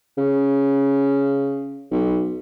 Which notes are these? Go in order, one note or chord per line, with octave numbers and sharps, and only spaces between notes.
C#3
B1